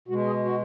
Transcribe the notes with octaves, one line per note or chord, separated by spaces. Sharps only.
B2 G#3 F#4
G#4
F#4